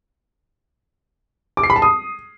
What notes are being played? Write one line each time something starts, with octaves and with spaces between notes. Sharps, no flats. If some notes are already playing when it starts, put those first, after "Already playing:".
D6
C7
B5
A5
D#6